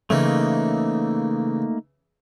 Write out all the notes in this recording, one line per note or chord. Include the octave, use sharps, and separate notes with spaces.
C#3 E3 A3 A#3 D#4